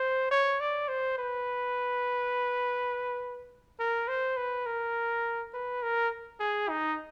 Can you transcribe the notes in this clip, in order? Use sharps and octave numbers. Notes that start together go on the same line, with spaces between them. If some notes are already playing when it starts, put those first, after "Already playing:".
Already playing: C5
C#5
D5
C5
B4
A#4
C5
B4
A#4
B4
A#4
G#4
D#4